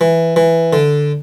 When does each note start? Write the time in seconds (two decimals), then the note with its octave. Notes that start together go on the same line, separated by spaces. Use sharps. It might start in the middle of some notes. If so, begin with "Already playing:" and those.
0.01 E3
0.36 E3
0.73 D3